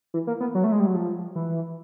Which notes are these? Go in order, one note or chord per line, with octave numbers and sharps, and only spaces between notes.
E3
A#3
B3
F#3
A3
G#3
G3
F#3
F3
E3